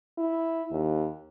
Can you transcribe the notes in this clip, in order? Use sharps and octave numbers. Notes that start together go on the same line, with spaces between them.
E4
D#2